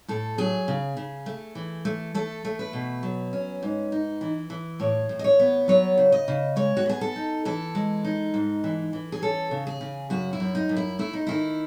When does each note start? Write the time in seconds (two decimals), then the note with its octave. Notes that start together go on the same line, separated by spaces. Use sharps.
0.08 A2 A4
0.38 F#3 G#4
0.68 C#3
0.97 C#3
1.26 A3
1.55 E3
1.85 A3
2.15 A3 A4
2.45 A3
2.59 B4
2.73 B2
3.03 F#3
3.33 C#4
3.63 G#2
3.92 D#4
4.21 E3
4.50 E3
4.80 A2 C#5
5.09 A2
5.19 D#5
5.24 C#5
5.39 B3
5.68 F#3 C#5
5.98 C#3
6.12 D#5
6.28 C#3
6.56 G#3 C#5
6.77 F#4
6.86 B3 G#4
7.01 A4
7.16 D#4
7.45 E3 A4
7.75 G#3
8.05 D#4
8.34 G#2
8.64 E3
8.93 E3
9.12 G#4
9.22 C#4 A4
9.51 C#3
9.67 G#4
9.81 C#3
10.10 F#2 F#4
10.33 E4
10.40 F#2
10.55 D#4
10.69 F#2
10.77 E4
10.99 A3 E4
11.13 D#4
11.27 D#3 E4